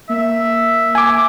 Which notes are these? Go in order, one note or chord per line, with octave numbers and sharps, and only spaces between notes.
A#3 E5
G#5 D6